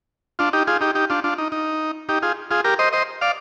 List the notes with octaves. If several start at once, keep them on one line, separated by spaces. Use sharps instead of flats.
D4 F4
D#4 G4
F4 G#4
D#4 G4
D#4 G4
D4 F4
D4 F4
D#4
D#4
D#4 G4
F4 G#4
F4 G#4
G4 A#4
C5 D#5
C5 D#5
D5 F5